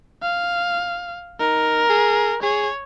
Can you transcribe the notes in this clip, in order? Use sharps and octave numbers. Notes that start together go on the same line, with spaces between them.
F5
D#4 A#4
G#4
G#4 C#5